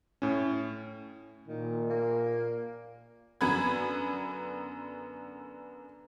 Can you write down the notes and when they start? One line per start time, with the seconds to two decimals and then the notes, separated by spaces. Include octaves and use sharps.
0.22 A2 C#4
1.48 A#2 D#3
1.90 A#3
3.41 F#2 D3 B3 B4 B5 G#6